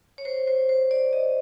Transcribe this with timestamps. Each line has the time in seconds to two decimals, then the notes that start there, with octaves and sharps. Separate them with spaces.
0.18 C#5
0.25 C5
0.47 C5
0.69 C5
0.91 D5
1.13 D#5